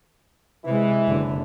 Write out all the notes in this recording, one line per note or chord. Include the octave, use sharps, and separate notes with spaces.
C3 E3 G#3 E4
F#1 D3